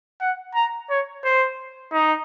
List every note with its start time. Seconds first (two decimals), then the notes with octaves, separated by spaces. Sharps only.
0.21 F#5
0.55 A#5
0.90 C#5
1.24 C5
1.93 D#4